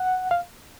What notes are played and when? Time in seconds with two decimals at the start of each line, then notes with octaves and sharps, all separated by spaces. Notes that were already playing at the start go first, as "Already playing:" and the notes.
Already playing: F#5
0.31 F5